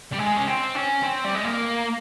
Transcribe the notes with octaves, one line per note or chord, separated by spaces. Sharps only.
G3
G#3
C#4
C4
C#4
C4
G3
G#3
A#3